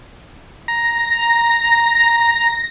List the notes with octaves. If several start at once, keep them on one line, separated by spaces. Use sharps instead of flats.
A#5 A#6